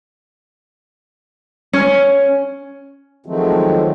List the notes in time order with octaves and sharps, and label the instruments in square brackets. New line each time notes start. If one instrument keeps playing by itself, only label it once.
[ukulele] C#4
[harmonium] D#3 F3 F#3 G#3 A3 C4